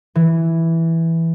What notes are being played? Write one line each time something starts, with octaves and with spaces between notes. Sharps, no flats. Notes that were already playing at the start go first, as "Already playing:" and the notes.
E3